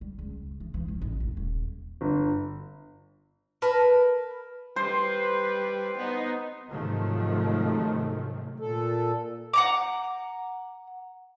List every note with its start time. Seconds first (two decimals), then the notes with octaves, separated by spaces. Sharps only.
0.01 G3
0.19 C#2
0.60 E3
0.74 E3
0.88 D#3
1.02 A1
1.20 E1
1.37 D#1
2.01 G1
3.62 A#4 B4 A5
4.76 G3 B4 C5
5.97 B3 D#4
6.70 G#2 C3 D#3 F3 F#3 A3
8.60 A#2 A4
9.53 F#5 A#5 D6